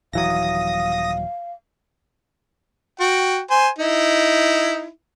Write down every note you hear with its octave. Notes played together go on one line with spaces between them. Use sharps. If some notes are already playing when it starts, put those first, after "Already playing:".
D#1 E3 F#3 F5 D#6 A#6
F#4 G5
C5 G#5
D#4 E4